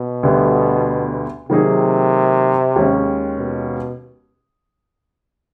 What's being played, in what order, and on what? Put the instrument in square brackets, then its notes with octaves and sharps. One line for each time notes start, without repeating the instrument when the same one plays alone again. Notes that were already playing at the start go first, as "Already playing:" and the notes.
Already playing: [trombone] B2
[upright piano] D2 D3 G3 B3
[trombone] C3 [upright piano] D#3 F#3 A#3 D#4 G#4
[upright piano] D#2 D#3 G#3 C#4
[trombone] B2